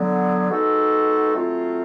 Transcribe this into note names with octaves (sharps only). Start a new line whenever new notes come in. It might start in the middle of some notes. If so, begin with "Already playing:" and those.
Already playing: D3 F#3 B3
G#3 B3 D#4 F#4 A4
F#3 A3 C4 F4